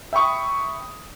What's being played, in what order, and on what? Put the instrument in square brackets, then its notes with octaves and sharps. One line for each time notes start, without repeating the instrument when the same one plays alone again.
[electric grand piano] E5 G5 B5 C#6 D#6